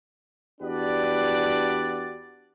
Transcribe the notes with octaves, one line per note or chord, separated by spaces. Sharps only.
E2 D4 F#4 G4 B4 D5